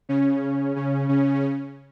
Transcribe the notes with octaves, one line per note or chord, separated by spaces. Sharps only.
C#3 C#4
C#3 C#4
C#3 C#4